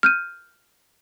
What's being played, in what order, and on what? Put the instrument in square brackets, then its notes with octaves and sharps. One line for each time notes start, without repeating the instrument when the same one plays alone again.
[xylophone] F6 G6 D#7